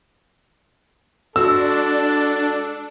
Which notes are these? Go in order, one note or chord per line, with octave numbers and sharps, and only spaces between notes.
G#3 D4 F#4 A4 E6